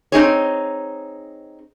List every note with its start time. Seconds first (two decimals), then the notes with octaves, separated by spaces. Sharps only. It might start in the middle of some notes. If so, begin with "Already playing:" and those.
0.12 C4 D#4 G#4 C#5